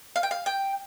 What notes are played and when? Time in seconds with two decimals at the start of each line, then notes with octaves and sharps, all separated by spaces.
0.16 F5
0.23 G5
0.31 F5
0.46 G5